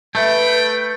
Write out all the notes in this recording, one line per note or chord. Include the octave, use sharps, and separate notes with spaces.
A3 B4 E5 G5 A5